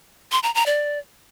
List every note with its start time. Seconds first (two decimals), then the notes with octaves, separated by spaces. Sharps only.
0.32 C6
0.43 A#5
0.55 A#5
0.66 D5